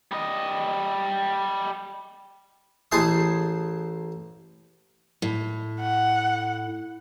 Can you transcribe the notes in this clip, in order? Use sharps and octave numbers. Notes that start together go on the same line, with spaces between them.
G3 D#5
A1 G#4 C5 A5 C6 D#6
A2
F#5